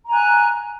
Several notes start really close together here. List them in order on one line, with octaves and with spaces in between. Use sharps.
A#5 G#5 F#6